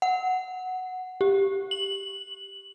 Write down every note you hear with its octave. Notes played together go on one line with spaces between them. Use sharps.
F#5
G4
F#7